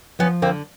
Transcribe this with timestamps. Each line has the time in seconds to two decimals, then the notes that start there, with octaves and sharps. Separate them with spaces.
0.19 F3 B3 C#4
0.42 D3 A#3 C4